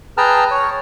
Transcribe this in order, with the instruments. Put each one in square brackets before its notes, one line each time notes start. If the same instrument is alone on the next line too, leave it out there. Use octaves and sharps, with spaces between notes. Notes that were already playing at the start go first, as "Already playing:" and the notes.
[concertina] G#4 B4 G5 A5 A#5 F6
C#5